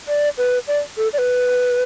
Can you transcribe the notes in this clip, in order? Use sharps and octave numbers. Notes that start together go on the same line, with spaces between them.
D5
B4
D5
A4
D5
B4